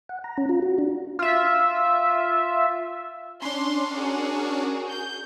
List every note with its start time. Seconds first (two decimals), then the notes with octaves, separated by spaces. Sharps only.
0.09 F#5
0.24 A#5
0.38 C#4
0.49 F4
0.62 F#4
0.78 D4
1.19 F4 E5
3.42 C#4 D4 C6
3.94 F#4 G#4 A#4
4.89 G6